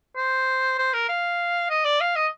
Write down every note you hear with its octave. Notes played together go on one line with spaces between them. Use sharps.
C5
C5
A#4
F5
D#5
D5
F5
D#5